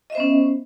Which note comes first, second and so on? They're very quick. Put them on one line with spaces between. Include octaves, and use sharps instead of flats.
D#5 E5 C5 B3 C#4